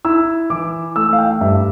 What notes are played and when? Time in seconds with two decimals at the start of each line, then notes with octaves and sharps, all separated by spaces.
0.05 E4 E6
0.50 E3 D6
0.96 A3 E6
1.13 F5
1.18 G5
1.41 G2 E5